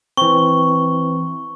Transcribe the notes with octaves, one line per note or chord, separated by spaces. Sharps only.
E3 C4 C#6